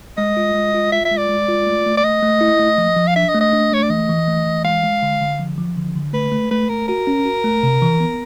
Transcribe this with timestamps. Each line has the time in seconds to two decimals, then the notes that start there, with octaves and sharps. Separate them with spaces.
0.18 G#3 D#5
0.37 F4
0.55 G#3
0.74 F4
0.92 F4 E5
1.05 E5
1.11 G#3
1.17 D5
1.29 G#3
1.48 F4
1.67 A3
1.86 A3
1.97 D5
2.04 A3 D#5
2.23 A3
2.41 E4
2.59 A3
2.78 F3
2.97 F3
3.07 F5
3.16 D4 E5
3.29 D#5
3.35 A3
3.41 D#5
3.53 D4
3.72 A3 C#5
3.82 D5
3.90 E3 D#5
4.09 E3
4.28 A3
4.46 E3
4.64 G#3 F5
4.83 G#3
5.03 D3
5.21 D3
5.40 F3
5.58 F3
5.76 D3
5.95 D3
6.13 A3 B4
6.32 A3
6.51 A3 B4
6.69 A3 A#4
6.88 F#4 A#4
7.07 C#4
7.25 F#4
7.44 A3
7.63 C3
7.82 E3
8.00 B3